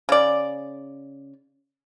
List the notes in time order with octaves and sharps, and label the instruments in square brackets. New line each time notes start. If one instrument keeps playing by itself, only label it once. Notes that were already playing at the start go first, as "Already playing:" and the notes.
[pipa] C#3 D5